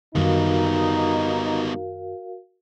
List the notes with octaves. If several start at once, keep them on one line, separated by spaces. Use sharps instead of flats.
F#2 D#3 G3 B3 D#4 F#4 A#4 F5